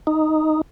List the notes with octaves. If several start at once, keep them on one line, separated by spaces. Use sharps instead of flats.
D#4